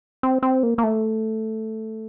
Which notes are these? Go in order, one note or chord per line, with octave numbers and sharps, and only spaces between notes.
C4
C4
A#3
A#3
A3